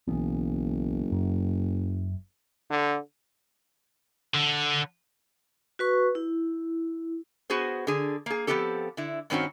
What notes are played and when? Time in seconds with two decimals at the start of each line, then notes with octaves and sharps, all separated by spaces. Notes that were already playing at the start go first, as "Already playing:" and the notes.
0.08 F#1 B1 E3 B3
1.12 F#2
2.69 D3
4.34 D3
5.79 F#4 B4 C#6
6.15 E4
7.50 B3 F#4 G#4 C5
7.87 D3 G#4
8.26 A#3 G#4
8.47 F3 F#3 B3 C4 G4 A4
8.97 D3 E4
9.30 G2 D#3 C4 C#4 F#4